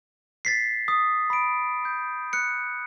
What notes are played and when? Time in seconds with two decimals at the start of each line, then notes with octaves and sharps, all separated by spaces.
0.45 A6 B6 C7
0.88 D#6
1.30 B5 D7
1.85 G6
2.33 F#6 C#7